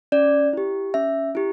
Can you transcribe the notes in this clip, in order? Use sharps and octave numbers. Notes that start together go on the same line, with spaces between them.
C#4 D5
E4 G4
C#4 E5
E4 G4